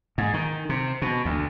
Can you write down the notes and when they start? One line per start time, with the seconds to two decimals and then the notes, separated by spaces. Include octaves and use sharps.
0.18 G#2
0.34 D#3
0.69 C3
1.02 B2
1.25 D2